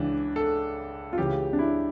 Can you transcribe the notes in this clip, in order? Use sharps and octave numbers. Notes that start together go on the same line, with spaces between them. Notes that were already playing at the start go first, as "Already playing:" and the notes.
Already playing: C#2 C#3 E3 D4
A4
F4
C#2 C#3 E3 G4
D4
E4